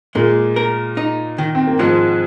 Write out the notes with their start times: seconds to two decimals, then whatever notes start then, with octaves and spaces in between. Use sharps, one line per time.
0.15 A#2 G#3 A#3
0.56 A#4
0.97 D#4
1.38 D#3
1.55 C4
1.67 A#3
1.79 G#2 F3 G#3